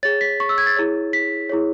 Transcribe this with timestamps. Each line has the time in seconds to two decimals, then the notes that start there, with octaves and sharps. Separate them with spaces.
0.03 G#4 C#5 A6
0.21 B6
0.40 C#6
0.49 E6
0.58 G#6
0.67 A6
0.77 E4 G#4 C#5
1.13 B6
1.49 E4 G#4 C#5